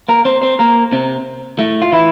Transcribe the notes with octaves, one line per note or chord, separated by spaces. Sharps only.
A#3 A#4
C4 C5
C4 C5
A#3 A#4
C3 C4
A2 A3
F4
E3 E4